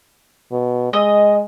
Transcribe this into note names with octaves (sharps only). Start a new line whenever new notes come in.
B2
G#3 D#5